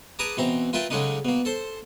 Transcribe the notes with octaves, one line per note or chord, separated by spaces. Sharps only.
G#4 B4 A5 A#5 D6
B2 E3 C4 A#5
F4 A#4 B4 E5 G5 A5
C#3 F#3 G#3 A3 D4 D#4
B2 A#3
A4 C5